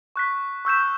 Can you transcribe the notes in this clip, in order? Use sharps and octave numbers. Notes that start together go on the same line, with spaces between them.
C#6 F#6 B6
C#6 E6 G6 B6 E7